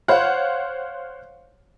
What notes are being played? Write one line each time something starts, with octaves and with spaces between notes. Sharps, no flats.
C5 C#5 F5 F#5